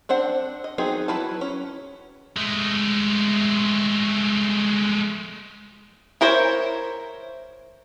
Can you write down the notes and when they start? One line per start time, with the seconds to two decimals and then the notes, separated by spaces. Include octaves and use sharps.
0.09 C4 D4 C5 F#5
0.64 D#5
0.78 F#3 B3 C4 D#4 G#4
1.08 F#3 E4 B4 A5
1.41 C#4
2.37 G#3 A3
6.21 E4 A#4 C5 C#5